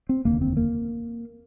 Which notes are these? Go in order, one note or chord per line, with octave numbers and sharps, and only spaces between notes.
C4
F1 D#2 D3 A#3
C4
A#3